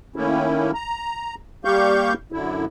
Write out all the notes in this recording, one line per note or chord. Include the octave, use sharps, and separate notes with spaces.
D#3 A3 A#3 C#4 E4
A#5
G3 A#3 G4 F5 C#6 G6
F#2 D3 E4